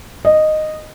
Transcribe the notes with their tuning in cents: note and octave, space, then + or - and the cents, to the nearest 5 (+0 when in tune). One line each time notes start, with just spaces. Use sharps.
D#5 -10